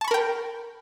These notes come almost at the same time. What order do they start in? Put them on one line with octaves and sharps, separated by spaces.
A5 C#6 B5 A#4 G5